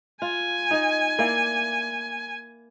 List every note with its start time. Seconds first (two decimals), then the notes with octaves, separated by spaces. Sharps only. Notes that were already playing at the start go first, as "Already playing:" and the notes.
0.22 F4 G#5
0.71 D#4 D#5
1.19 A#3 E4 D5